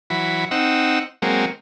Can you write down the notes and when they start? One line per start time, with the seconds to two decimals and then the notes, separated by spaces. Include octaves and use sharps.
0.10 E3 F#3 B5
0.51 C4 D#4 F#5 E6
1.22 F#3 G#3 A#3 C4